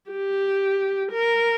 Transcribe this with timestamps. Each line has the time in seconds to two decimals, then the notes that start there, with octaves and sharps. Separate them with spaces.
0.11 G4
1.12 A#4